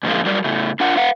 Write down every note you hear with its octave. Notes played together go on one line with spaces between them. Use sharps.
G#2 B2 D3 F3 G#3 A#3
F#3 G3 A#4 D5
A2 C#3 A3
D4 F4 A#4 F#5
B4 F5 F#5